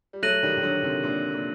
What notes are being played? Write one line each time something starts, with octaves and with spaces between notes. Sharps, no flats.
G3
F#3 A3 F#6 A#6 D#7 F#7
D#3 G3
D#3
D3 F#3
C3 D#3
A#2 D3
A#2